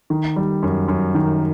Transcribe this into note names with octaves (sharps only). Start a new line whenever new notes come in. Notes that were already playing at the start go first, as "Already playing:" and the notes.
D#3
G3
F#2
F#2
D#3